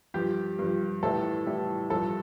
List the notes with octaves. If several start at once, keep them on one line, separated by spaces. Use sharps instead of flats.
G2 F3 G4
G2 F3
A2 E3 G3 A4
A2 E3 G3
G2 F3 A4